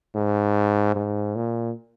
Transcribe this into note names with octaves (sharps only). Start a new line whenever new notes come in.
G#2
G#2
A#2